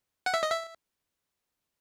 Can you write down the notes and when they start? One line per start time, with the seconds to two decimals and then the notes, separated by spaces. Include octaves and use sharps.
0.26 F#5
0.34 E5
0.43 D#5
0.51 E5